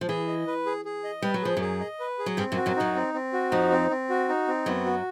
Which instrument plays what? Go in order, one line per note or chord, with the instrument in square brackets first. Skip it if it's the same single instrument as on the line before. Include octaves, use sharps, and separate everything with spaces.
[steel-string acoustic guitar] F3
[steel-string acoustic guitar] E3 [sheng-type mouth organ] G#4
[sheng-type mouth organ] D#5
B4
G#4
G#4
D#5
[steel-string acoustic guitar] G3 [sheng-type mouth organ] B4
[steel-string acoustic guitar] F#3
[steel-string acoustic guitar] F3 [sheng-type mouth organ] G#4
[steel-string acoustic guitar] F#2 F#3 [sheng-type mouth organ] G#4
[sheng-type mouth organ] D#5
B4
G#4
[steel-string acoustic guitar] F#3
[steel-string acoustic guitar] G2 G3 [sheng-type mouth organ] C4
[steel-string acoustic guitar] F#2 F#3
[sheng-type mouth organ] F#4
[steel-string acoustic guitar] F#2 F#3
[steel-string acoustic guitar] F#2 F#3 [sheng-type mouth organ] D#4
[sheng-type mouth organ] C4
C4
F#4
[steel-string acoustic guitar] F2 F3 [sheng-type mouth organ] D#4
[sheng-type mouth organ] C4
C4
F#4
D#4
C4
[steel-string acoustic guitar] F#2 F#3 [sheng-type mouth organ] B3
[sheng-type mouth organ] F#4